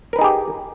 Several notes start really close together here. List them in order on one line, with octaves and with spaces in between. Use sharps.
A#4 B4 D#4 G#4 G4